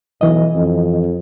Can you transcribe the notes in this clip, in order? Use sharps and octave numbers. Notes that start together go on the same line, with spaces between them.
B1 E3 D#5
F2